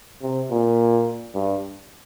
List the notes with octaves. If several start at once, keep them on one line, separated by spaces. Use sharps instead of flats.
C3
A#2
G2